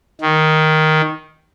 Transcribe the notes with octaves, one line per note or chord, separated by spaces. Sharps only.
D#3